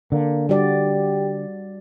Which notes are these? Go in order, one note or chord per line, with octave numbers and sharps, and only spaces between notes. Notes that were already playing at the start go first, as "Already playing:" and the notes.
D3 A#3
G3 F#4 G4 D5